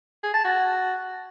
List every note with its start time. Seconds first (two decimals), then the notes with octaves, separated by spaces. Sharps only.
0.23 G#4
0.34 A5
0.45 F#4